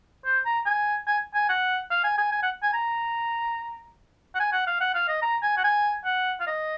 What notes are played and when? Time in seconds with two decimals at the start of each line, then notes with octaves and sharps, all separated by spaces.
0.25 C5
0.45 A#5
0.66 G#5
1.07 G#5
1.35 G#5
1.49 F#5
1.90 F5
2.04 G#5
2.18 G#5
2.32 G#5
2.43 F#5
2.63 G#5
2.73 A#5
4.35 F#5
4.40 G#5
4.53 F#5
4.67 F5
4.81 F#5
4.94 F5
5.09 D#5
5.22 A#5
5.43 G#5
5.57 F#5
5.64 G#5
6.05 F#5
6.40 F5
6.47 D#5